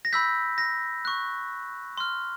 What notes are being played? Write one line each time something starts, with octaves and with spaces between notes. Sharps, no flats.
A#6
B5 E6 G6 B6
A#6
C#6 F#6
C6 F6